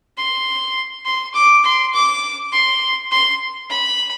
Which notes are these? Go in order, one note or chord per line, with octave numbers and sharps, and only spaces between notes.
C6
C6
D6
C6
D6
C6
C6
B5